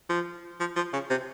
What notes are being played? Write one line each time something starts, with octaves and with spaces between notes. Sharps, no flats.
F3
F3
F3
C#3
C3